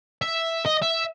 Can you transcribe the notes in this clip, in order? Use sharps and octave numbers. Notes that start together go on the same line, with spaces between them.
E5
D#5
E5